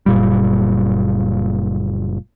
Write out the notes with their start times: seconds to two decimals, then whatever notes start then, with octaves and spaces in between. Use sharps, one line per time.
0.06 F#1 A#2 G3